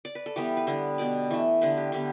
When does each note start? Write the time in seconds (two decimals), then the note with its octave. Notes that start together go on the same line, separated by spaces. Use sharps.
0.05 D5
0.15 B4
0.26 A4
0.36 E3 G3 B3 G4
0.57 B4
0.67 D3 G3 B3
0.98 B2 B3 D5
1.31 E3 A3
1.61 D3 G3 B3 B4
1.77 G4
1.92 D3 G3 B3 G4